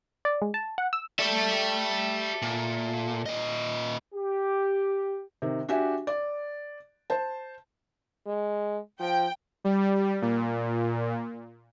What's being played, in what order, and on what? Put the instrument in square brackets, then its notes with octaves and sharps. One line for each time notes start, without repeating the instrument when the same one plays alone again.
[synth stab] D5
G#3
A5
F#5
E6
[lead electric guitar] G4 D5 [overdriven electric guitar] A4 E5
[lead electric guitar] A#2
A#2 D#5
[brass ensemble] G4
[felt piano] C3 D#3
D4 F#4 G4 E5 G#5
D5
C5 A5
[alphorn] G#3
[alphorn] F3 [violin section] G5
[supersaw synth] G3
A#2